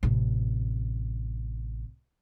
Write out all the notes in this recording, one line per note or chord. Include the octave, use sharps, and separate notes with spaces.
A1 C3